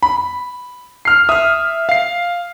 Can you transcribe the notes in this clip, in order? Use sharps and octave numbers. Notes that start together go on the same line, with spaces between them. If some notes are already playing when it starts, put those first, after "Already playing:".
B5
F6 C7
E5 D#6 F6
F5 C7